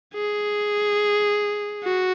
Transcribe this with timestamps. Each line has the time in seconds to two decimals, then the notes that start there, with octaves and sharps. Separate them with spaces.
0.14 G#4
1.84 F#4